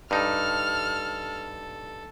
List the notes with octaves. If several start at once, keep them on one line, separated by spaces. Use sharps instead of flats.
G2 D#4 A4 F6